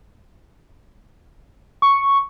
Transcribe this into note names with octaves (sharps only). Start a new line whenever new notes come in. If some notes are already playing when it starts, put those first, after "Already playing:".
C#6